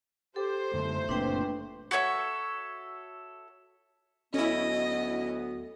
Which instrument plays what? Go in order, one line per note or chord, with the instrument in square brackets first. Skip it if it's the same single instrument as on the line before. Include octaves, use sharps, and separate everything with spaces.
[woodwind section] G4 [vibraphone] A4 [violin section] C5
[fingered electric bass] F#2 D3 [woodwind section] A3
[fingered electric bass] F#1 A#2 C4 [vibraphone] D4 B4 G5
[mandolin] F#4 A4 C#5 E5
[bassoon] D2 [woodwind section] F#3 B3 [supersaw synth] C#4 E4 [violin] D#5